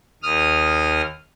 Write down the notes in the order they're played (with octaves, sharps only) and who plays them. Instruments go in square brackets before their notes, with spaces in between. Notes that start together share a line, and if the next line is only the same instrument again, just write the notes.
[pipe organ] D#2 D#6 F6